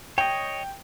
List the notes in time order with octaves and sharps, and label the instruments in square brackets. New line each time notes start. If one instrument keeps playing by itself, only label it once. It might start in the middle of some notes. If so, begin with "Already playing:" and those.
[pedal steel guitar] C#5 D#5 [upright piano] G5